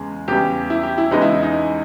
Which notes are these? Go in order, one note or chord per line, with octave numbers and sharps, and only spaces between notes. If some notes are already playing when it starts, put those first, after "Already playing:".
Already playing: E2 C#3 G#3
E2 C#3 E3 G3 G4
E4
G4
E4
E2 C#3 G#3 B3 D#4
E4
D#4
D#4